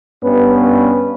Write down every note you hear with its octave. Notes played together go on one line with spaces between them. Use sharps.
G2 B3 C#4 B4